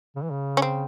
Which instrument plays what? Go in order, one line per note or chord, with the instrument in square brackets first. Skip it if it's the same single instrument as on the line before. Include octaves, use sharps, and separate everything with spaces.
[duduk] C#3
E3
C#3
[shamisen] C#4
C4